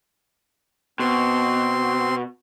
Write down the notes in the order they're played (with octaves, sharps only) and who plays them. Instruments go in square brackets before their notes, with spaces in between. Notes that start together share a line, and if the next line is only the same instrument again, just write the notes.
[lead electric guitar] B2 [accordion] C4 C6